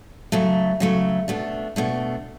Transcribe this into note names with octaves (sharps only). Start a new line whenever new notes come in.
C#3 F#3 A3
C#3 F#3 A3
B2 A3 D4
B2 A3 D4